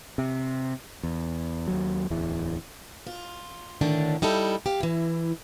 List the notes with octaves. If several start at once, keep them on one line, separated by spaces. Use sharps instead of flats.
C3
E2
D#2 F#3
D1 E2 E3
F4
A2 D3 D#3 D4
G3 D#4 E4 A4
G4 F5
E3 E4